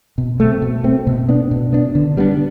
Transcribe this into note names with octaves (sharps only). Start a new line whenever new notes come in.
B2
A3 C4
B2
A3 C4
B2
B3 D4
B2
B3 D4
D3
G3 B3 D4